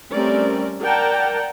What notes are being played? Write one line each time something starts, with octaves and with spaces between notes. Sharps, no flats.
G3 A3 C4 C#4 A#4 D5
A#4 D5 F#5 G5 A5 A#5